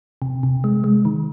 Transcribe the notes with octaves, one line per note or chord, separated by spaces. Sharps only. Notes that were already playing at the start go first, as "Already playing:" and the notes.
C3
C3
G#3
G#3
D#3